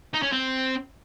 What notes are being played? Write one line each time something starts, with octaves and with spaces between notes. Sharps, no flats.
D#4
C#4
C4